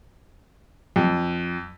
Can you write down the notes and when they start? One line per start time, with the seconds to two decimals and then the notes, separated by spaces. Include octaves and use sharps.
0.96 F2